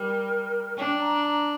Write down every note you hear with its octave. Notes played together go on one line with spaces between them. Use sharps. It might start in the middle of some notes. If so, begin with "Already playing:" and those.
Already playing: G3 A#4
D4 G5
A#5
A#5